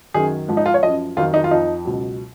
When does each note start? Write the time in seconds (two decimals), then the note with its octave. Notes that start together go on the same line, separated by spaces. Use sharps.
0.14 F#2 D#3 F#3 G#4
0.48 G#2 F3
0.57 D#4
0.66 F4
0.74 C#5
0.83 F#2 F3 D#5
1.17 F2 D#3 F#3 F4
1.34 D#4
1.44 F4
1.51 F2 F3 D#4
1.85 C#2 B2 F#3